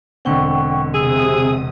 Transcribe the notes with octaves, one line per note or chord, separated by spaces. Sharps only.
E1 D3 C4 F#5 G5 C#6
C3 G#4 D#6 E6